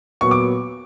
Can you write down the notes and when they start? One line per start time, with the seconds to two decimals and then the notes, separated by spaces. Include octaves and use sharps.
0.21 A#2 F#3 B3 C#6
0.31 D6